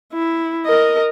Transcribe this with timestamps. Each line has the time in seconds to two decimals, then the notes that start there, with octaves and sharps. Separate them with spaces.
0.13 E4
0.66 A#4 D#5